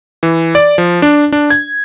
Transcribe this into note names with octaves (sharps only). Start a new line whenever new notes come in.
E3
D5
F3
D4
D4
G#6